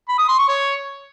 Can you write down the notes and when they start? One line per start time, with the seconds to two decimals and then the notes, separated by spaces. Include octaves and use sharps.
0.09 B5
0.19 D#6
0.28 C6
0.38 C#6
0.48 C#5